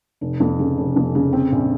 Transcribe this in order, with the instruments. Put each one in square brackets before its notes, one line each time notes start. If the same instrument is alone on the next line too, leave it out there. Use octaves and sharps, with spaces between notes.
[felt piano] F1
F2
C#3
F1
F2
C#3
C4
A#1